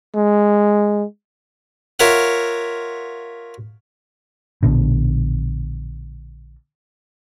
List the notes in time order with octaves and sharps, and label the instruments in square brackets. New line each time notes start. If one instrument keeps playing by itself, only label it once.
[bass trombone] G#3
[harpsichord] F4 A#4 C#5 E5 F#5
[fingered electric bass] A#1 B2 D3